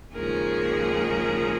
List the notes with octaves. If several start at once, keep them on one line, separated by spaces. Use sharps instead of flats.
D#2 C#3 F3 G#3 G#4 A#4